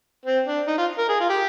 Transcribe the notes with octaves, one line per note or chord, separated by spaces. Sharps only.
C4
D4
D#4
F4
A#4
G#4
F4
G4